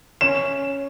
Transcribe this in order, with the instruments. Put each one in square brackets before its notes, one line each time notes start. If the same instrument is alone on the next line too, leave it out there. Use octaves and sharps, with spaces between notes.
[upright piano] C#4 [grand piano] E7